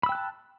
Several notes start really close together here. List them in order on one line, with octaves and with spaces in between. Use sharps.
B5 E6 G5 F#6 A5